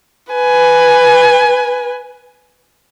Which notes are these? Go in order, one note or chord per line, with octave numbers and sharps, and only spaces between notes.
B4 G#5